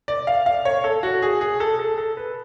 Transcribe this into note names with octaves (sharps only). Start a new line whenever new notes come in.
D5
F5
F5
C#5
A4
F#4
G#4
G#4
A4
A4
A4
B4